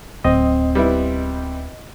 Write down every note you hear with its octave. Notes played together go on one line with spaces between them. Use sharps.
D1 C4 D#5
G3 B3 E4